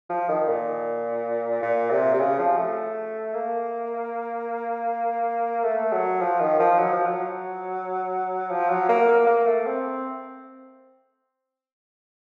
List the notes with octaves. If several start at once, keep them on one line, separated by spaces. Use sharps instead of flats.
F3
D#3
A#2
A#2
C3
C3
C#3
F3
A3
A#3
A3
F#3
F3
D#3
F3
F#3
F3
F#3
F3
F#3
A#3
A#3
A#3
A3
C4